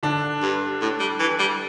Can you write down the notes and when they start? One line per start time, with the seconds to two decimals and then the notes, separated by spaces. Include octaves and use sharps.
0.03 D3 D4
0.42 G2
0.81 A2
1.00 G3
1.20 E3
1.39 G3